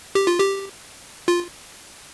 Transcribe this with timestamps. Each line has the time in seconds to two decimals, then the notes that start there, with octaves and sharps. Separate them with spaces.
0.15 G4
0.27 F4
0.40 G4
1.28 F4